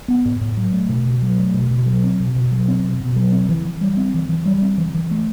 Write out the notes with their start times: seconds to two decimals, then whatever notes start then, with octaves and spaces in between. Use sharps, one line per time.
0.08 B3
0.25 A2
0.41 A2
0.57 F#3
0.73 A3
0.89 B2
1.05 B2
1.22 F#3
1.38 A3
1.54 B2
1.71 B2
1.86 F#3
2.03 C4
2.20 B2
2.35 B2
2.52 F#3
2.68 C4
2.84 B2
3.00 B2
3.16 F#3
3.32 C4
3.49 E3
3.65 E3
3.81 G3
3.97 C4
4.14 E3
4.29 E3
4.45 G3
4.62 C4
4.78 E3
4.94 E3
5.11 A3